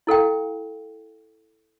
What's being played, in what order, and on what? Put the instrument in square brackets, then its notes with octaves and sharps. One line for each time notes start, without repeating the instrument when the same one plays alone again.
[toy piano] E4 A4 F5 G5